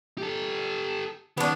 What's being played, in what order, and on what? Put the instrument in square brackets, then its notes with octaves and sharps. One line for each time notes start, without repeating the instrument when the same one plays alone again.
[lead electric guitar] G4 A4
[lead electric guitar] D#3 C#4 [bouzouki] B3 D4